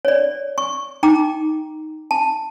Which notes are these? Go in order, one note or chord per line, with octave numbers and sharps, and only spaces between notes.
C#5 D5
C#6
D#4 G5 A#5 D6
A5